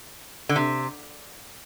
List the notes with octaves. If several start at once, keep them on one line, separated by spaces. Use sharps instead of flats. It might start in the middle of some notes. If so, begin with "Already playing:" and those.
D3
C3